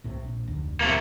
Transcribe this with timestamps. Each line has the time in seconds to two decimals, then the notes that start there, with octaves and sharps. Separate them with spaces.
0.04 C2 A2 C3
0.24 A#1
0.48 F1 D2
0.81 D1 C3 A3 A#3